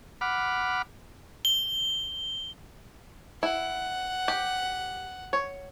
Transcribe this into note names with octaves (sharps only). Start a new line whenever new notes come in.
F#5 B5 D6 F6
G7
E4 F#5
G4
C#5